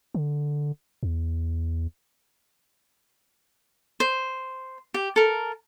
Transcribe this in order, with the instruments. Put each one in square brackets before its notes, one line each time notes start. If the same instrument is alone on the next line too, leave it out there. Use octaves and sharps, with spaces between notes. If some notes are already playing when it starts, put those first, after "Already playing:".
[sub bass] D3
E2
[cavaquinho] C5
G4
A4 A#4